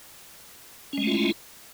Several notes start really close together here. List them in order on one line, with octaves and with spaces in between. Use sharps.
C#4 G#3 A3 F4 E4